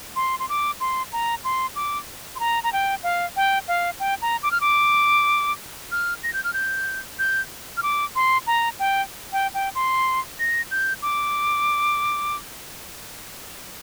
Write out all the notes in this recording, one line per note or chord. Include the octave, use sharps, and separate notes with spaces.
C6
C6
D6
C6
A#5
C6
D6
C6
A#5
A#5
G5
F5
G5
F5
G5
A#5
D6
F6
D6
F6
A#6
G6
F6
G6
G6
F6
D6
C6
A#5
G5
G5
G5
C6
A#6
G6
D6